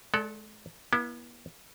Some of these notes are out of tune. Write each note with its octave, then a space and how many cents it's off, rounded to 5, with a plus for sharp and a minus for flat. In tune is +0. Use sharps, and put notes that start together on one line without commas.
G#3 +40 A4 +5 D5 -10
B3 -40 E4 +5